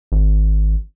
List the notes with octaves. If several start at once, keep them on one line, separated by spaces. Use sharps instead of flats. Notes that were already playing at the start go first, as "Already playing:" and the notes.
G#1